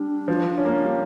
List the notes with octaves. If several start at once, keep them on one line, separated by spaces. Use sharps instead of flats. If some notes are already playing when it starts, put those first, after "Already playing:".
Already playing: G3 D4
F3
C#4
A#3
G3